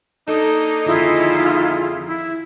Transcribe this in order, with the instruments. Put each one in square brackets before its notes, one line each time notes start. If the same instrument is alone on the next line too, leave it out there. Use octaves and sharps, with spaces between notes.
[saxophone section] A#3 D4 D#4 [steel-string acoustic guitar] A4
[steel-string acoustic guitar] F2 D3 D#3 [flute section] E4 F4 G#4
[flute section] E4